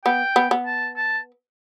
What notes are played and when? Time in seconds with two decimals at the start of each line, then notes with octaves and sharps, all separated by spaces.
0.05 B3 G5
0.36 B3
0.51 B3
0.66 A5
0.97 A5